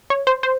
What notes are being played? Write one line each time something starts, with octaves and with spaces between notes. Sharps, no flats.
C#5
C5
C5